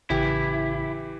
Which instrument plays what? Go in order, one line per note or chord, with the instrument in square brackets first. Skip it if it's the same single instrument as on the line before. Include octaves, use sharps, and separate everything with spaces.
[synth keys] A1 C#3 [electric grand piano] E3 G4 [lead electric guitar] E4